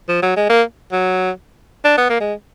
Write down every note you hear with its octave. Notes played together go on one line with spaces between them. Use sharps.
F3
F#3
G#3
A#3
F#3
D4
B3
A#3
G#3